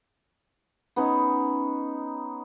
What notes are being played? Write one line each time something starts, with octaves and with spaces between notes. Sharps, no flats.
B3 C#4 D#4